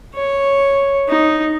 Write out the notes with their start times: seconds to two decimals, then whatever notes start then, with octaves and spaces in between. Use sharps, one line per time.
0.15 C#5
1.09 D#4